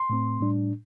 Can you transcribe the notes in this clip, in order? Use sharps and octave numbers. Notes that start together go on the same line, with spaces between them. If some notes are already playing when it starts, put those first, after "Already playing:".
Already playing: C6
A2 A3 C4
A2 G3 D4